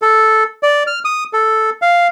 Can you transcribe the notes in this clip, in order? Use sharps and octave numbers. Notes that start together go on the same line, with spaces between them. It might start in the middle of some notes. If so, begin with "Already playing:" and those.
A4
D5
F6
D#6
A4
F5